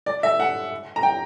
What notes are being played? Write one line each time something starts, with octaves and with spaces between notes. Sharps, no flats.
D5
E5
F#5
A#5
G5